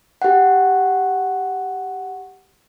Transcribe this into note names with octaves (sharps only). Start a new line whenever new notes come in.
G4 F#5